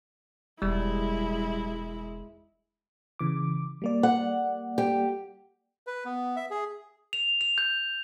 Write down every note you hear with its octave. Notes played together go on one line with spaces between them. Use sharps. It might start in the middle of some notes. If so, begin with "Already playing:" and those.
E1 G3 G#3 E4
C#3 E3 D6
G3 A#3 D5
F#5
G4
B4
B3
E5
G#4
F7
F7
G6